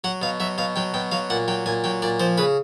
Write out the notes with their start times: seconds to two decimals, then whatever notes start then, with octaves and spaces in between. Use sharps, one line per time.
0.04 F#3 F#5
0.22 B2 F5
0.40 F#3 E5
0.58 B2 F5
0.76 F#3 G5
0.94 B2 G5
1.11 F#3 F5
1.30 A#2 F#5
1.48 F#3 G5
1.66 A#2 G#5
1.84 F#3 G5
2.02 A#2 D5
2.20 F3 C5
2.38 C#3 B4